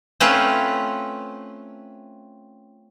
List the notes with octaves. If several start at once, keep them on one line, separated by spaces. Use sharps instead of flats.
A3 C4 C#4 F4 B4